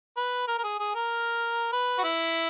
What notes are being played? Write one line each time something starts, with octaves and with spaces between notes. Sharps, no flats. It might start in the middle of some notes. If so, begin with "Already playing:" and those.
B4
A#4
A#4
G#4
G#4
A#4
B4
F#4
E4